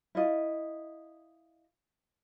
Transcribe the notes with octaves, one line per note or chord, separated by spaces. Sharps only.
E4 F4 D#5